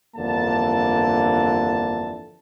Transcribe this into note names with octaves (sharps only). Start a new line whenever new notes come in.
G1 F2 D3 E3 A#3 A5